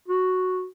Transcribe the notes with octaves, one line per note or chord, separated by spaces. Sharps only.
F#4